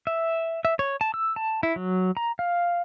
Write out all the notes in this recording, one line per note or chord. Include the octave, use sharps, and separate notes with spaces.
E5
E5
C#5
A5
E6
A5
E4
F#3
A#5
F5